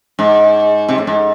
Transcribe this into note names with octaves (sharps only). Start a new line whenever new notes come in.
G#2
C3
A2
G#2